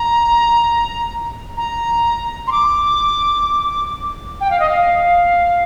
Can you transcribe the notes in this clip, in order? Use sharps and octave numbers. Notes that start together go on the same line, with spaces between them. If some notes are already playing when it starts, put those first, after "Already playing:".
Already playing: A#5
A#5
C6
D6
G5
F5
D#5
F5